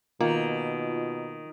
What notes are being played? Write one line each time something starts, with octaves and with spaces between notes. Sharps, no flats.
B2 D#3 A#3 F4